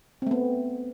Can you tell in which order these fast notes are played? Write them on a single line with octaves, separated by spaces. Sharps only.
C4 A3 B3